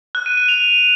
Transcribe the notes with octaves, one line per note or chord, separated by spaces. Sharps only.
F#6
D#7
D#7
F7